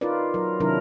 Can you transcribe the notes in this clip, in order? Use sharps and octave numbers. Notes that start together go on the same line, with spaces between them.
D#4 F4 A#4 B4 D5
F#3 A#4
C3 D#3 F#3 D4 E4 A#4